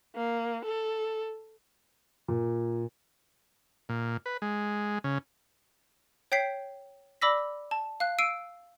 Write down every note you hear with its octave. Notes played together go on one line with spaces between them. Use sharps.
A#3
A4
A#2
A#2
B4
G#3
C#3
C#5 G5 G6 B6 C7
D5 B5 D6 E6 A#6 B6
A5
F5 F#6
E6 C7 D7 D#7